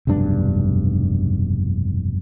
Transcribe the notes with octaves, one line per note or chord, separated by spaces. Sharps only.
F1 B1 G2 D4